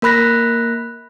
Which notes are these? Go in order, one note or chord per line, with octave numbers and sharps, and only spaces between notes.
A#3 A#4 B5 F#6 A#6 B6